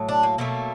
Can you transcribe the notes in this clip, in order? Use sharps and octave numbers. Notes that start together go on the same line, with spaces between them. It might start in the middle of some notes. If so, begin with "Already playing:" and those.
Already playing: A2 F#3
D4
A#3
B2 F#3 A3 A#3